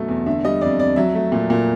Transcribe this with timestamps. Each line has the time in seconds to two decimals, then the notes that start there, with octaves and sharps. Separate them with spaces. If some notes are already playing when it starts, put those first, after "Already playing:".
Already playing: F#2 B2 F#3 A3
0.08 E2
0.26 D3 E5
0.44 G3 D#5
0.61 F2 D5
0.80 F2 D5
0.96 F#3 E5
1.15 A3
1.32 A#2
1.50 A#2